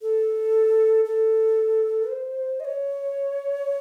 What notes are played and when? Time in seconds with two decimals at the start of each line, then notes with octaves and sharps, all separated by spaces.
0.02 A4
1.05 A4
2.08 C5
2.60 D#5
2.65 C#5